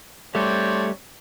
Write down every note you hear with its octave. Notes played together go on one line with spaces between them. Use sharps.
G3 A3 C4 D4 C#5